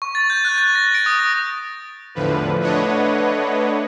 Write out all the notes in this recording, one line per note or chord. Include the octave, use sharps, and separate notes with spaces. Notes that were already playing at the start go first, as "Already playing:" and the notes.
C#6
A6
G6
F#6
A6
A#6
D7
D#6
A#6
E2 A2 D3 F3 B4
A3 D4 B4 C#5 D#5 F#5